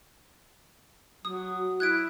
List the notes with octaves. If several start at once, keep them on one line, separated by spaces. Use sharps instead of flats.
F#3 D#6
E4 F#6 G#6 D7